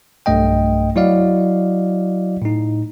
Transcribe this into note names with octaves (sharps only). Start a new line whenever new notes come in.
B1 G2 A3 D#5 G5
F#3 E4 F#4 D5 D#5 F5
A2 D#4